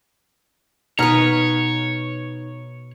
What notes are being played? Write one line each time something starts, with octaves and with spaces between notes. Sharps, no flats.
B2 D#4 B4 C#5 F6